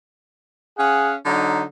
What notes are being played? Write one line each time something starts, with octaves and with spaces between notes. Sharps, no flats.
C#4 G#4 F5 F#5
D3 F#3 D#4